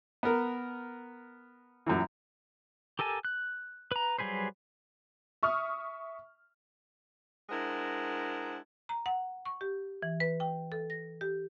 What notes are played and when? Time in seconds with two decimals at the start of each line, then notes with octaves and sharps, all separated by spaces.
0.23 B3 A#4
1.86 F#2 A#2 E3
2.99 G4 A4 A#4 G#5 A5
3.25 F#6
3.92 B4 A#5
4.18 F#3 G3 G#4 B4 C5
5.43 E5 C#6 D#6 F6
7.49 G#3 D4 E4 A#4 C5 F#5
8.89 A#5
9.06 F#5
9.46 C#6
9.61 G4
10.02 E3
10.20 B4
10.40 G5
10.72 A4
10.90 A#6
11.21 G4